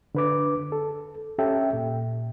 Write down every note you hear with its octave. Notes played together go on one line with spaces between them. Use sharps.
D3 B4 D6
A4
C#4 G4 A4 E5 G5
A#2